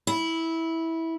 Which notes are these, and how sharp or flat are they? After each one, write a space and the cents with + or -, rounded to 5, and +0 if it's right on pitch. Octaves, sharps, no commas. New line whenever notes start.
E4 -15